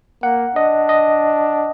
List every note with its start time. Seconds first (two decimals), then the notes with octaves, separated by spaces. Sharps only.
0.23 A#3 F#5
0.56 D4 D#5
0.89 D#5